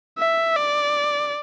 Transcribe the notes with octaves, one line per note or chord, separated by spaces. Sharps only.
E5
D5